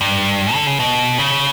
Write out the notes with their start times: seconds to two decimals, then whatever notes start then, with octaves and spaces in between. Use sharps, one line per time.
0.01 G2
0.54 D3
0.67 C#3
0.80 B2
1.18 C#3